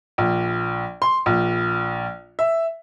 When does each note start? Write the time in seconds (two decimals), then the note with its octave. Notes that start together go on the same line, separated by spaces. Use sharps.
0.18 A#1
1.02 C6
1.26 A#1
2.39 E5